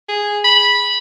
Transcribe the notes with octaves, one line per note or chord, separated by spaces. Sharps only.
G#4
B5